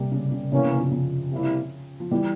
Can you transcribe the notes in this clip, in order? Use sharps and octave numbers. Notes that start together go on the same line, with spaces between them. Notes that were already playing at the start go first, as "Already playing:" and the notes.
Already playing: C3 G3 A#3
C#3
C#3
C3 E3 A#3 C#4
C#3
C#3 F3
C#3 F3
C3 G3 A#3 E4
F3
E3 G3